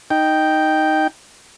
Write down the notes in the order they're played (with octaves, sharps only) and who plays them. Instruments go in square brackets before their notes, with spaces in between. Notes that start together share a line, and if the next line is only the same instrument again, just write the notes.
[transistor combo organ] D#4 G5